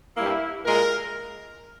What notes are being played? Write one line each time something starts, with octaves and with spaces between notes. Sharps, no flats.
G2 G3 A#3 E4
A#2 G#3 A#4